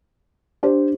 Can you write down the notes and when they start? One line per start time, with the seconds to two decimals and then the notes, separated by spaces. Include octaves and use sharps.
0.63 D4 G4 C5